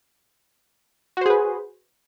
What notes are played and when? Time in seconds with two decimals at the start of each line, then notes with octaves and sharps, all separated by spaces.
1.17 F#4
1.21 C5
1.26 G#4
1.30 B4